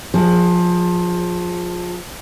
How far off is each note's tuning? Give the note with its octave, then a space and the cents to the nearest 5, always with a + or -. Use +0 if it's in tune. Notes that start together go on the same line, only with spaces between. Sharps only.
F3 +20 G#4 +0